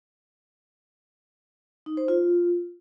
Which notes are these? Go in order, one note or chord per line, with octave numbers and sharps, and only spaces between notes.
D#4
C5
F4